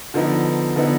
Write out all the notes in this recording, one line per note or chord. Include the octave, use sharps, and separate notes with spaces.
D3 F3 B3 D#4
D3 F3 B3 D#4